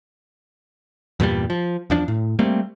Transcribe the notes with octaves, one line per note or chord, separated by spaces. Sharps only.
E2 G2 A#2 G3
F3
E2 F3 D4
A2
G3 A3 A#3 C4